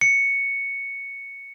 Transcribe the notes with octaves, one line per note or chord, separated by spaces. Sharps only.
C#7